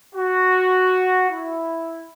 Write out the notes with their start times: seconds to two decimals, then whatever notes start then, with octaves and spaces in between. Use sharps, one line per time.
0.15 F#4
1.29 E4